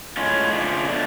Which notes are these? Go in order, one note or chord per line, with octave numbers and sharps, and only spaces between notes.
A2 G#3 C#4 F4
C#3 F3 A3 D4 F4
B2 A3 D4 F4